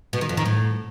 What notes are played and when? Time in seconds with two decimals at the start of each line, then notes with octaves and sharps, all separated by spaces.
0.13 B2
0.21 D#3
0.29 F2
0.37 D#3
0.45 A2